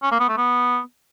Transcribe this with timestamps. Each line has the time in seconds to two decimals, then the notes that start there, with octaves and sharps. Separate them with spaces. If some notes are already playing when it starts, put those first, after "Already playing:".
0.03 C#4
0.11 A#3
0.20 B3
0.29 A3
0.37 B3